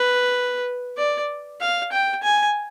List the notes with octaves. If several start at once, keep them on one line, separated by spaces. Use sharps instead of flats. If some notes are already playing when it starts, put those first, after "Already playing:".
Already playing: B4
D5
F5
G5
G#5